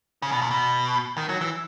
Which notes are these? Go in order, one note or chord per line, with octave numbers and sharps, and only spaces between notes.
C#3
B2
A#2
B2
D#3
F#3
E3